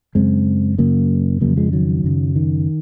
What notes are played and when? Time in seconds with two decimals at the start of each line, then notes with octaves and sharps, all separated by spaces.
0.15 F#2 C#3 G#3 C4
0.78 F#2 C#3 F#3 A#3
1.41 F2 C#3 F#3 A#3
1.57 F3 G#3
1.72 D#3 F#3
2.04 F#2 C#3
2.36 D#3